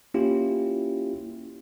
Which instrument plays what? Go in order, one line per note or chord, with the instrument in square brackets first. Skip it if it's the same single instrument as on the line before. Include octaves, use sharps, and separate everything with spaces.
[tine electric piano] A#3 C#4 E4 F4 G4